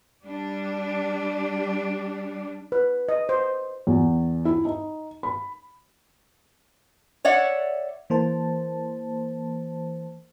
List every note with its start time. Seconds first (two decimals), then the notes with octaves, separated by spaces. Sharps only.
0.24 G3 D4
2.72 B4
3.09 D#5
3.29 C5
3.87 E2
4.45 E4
4.65 D#4
5.23 B5
7.25 C#5 D5 E5 F#5
8.10 E3 A#3 C5 A5